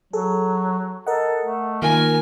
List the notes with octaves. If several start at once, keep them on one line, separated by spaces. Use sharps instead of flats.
F#3 G#4 A4
A4 A#4 D#5 F#5
A3
D#3 A#3 F4 A#4 G#5